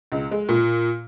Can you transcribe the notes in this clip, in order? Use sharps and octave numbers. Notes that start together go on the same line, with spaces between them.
C#2
G#3
A#2